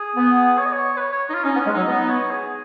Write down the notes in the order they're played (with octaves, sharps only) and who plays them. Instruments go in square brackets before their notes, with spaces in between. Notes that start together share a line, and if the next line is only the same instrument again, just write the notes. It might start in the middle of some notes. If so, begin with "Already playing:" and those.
Already playing: [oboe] G#4
[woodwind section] B3
[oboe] C#5
D#5
C#5
B4
C#5
C#5
D#4
F4
[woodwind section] C#4 [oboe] D#4
[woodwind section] B3
[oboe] C#4
[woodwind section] G#3
[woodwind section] F#3 [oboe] D#4
[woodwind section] B3 [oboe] D#4
[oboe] C#5
G#4